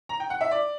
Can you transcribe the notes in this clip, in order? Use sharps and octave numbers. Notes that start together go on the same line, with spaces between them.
A#5
G5
F#5
E5
D5